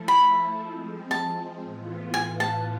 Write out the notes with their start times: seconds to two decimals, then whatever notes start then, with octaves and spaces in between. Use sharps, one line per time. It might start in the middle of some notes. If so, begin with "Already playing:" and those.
Already playing: F3 A3 E4 A4
0.08 B5
0.59 F3 G#3 C4
1.11 A5
1.62 A2 E3 B3 F4
2.14 G#5
2.40 A5